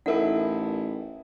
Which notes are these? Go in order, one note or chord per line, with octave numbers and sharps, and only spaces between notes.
A1 D#4 E4 A4 A#4 F#5